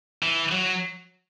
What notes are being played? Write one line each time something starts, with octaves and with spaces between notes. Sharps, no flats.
E3
F#3